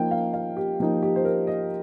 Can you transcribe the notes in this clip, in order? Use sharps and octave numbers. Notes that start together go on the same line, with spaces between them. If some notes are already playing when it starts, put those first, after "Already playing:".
Already playing: F3 A#3 D#4 G5
F5
F5
G4
F3 A#3 D#4
G4
C5
A#4
D#5